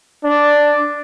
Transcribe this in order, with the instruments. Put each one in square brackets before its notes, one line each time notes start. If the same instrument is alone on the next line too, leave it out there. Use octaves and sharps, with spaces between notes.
[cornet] D4